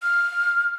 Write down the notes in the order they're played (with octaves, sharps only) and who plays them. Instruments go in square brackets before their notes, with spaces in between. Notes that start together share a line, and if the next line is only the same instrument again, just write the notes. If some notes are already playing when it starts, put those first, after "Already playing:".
[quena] F6